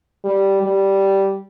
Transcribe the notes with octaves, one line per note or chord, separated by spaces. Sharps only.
G3
G3